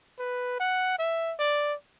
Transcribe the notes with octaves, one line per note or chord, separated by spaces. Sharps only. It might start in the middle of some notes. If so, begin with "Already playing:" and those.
B4
F#5
E5
D5